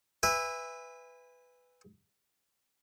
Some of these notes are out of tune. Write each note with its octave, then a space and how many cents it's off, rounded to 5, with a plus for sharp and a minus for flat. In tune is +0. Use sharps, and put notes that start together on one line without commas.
B4 +10 E5 +0 G#5 -30